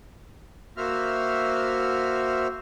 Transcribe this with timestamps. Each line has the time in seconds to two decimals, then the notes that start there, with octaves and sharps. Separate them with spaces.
0.77 A#3 F#4 C5 E5 F6